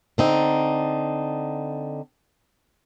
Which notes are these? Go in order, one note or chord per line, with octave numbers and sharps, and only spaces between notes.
D3 C4 D#4